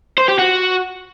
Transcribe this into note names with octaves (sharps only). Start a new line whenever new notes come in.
C5
G4
F#4